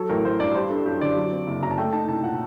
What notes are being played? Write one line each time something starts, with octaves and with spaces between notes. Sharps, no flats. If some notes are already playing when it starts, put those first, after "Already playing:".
Already playing: F#3 A4
A1 A#4
A1 C5
G2 D5
G3 C5
D4 A4
F#2 G4
D3 D5
F#3
C4
F#1
F#2 A#5
A5
A3 G5
D#4 A5
C2 A5
A#2 F#5